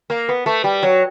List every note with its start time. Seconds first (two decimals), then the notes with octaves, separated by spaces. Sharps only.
0.10 A#3
0.29 B3
0.46 A3
0.64 G3
0.83 F#3